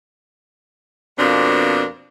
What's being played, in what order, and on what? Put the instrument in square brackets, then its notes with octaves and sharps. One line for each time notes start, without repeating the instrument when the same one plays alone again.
[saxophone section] F2 B2 F3 A#3 C4 D4